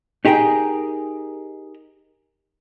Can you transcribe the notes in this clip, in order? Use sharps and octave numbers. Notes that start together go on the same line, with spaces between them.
D#4 G4 G#4 A#4 G5